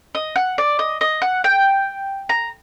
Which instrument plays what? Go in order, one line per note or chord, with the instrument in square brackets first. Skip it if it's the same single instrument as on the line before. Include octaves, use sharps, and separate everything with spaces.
[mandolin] D#5
F#5
D5
D#5
D#5
F#5
G5
A#5